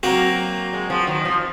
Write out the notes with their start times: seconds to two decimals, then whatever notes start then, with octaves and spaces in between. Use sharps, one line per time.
0.03 F#3 A#3 C4 F#4
0.73 G#3
0.90 F3
1.07 D#3
1.25 F3